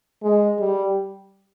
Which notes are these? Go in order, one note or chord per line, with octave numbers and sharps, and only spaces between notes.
G#3
G3